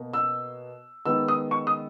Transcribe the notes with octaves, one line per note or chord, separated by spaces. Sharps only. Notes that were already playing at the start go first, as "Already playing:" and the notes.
Already playing: B2 A#3
E6
D#3 G#3 B3 E6
D#6
C#6
D#6